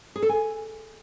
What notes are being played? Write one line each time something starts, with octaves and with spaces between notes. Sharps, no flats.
G#4
A4
G#5